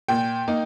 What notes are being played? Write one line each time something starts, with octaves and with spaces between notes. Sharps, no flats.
A#2 G5
A#3 D#4